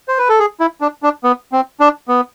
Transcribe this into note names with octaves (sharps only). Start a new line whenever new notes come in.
C5
B4
A4
G#4
E4
D4
D4
B3
C4
D4
B3